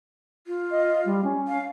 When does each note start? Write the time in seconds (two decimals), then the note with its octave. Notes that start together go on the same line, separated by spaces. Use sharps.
0.47 F4
0.71 D#5
1.05 G3
1.23 C#4
1.48 F5